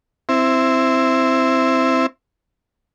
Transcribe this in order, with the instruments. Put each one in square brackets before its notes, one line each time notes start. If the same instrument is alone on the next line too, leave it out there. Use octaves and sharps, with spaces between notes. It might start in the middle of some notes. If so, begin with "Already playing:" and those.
[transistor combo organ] C4 E4